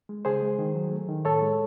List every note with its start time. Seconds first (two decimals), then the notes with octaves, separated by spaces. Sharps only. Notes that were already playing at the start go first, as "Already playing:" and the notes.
0.09 G#3
0.25 C#3 G#4 C5
0.43 G#3
0.59 D#3
0.75 F#3
0.91 A3
1.09 D#3
1.25 A2 A4 C#5
1.42 G#3